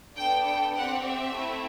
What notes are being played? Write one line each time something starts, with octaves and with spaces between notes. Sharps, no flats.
B3 D4 A4 G5
G5
C4 G4 F#5
E5
A3 C4 E4